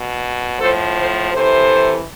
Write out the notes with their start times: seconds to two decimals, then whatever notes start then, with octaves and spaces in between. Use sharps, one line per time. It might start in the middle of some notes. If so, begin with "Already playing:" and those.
Already playing: B2
0.60 A2 F3 A4 C5
0.96 A4 C5
1.32 C3 E3 A4 C5